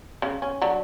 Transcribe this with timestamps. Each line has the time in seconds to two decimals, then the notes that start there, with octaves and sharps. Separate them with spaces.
0.22 C#3
0.42 C#4
0.62 D3 F#3